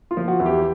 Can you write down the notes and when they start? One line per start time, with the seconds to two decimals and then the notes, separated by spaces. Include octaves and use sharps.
0.11 F4
0.17 F3
0.28 F#4
0.40 E2
0.46 G4